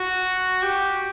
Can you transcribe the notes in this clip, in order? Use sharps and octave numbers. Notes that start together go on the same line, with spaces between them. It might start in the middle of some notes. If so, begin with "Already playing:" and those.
Already playing: F#4
G4